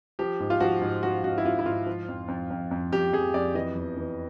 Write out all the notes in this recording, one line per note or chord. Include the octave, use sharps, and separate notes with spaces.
F3 G4
G#2
F4
F3 F#4
G#2
F3 F#4
G#2 F#4
E4
G#2 F4
E4
G#2 F4
F3
F2
F2
F2
F2
F2 G4
F2 G#4
F2 D5
E3 D#5
E2
E3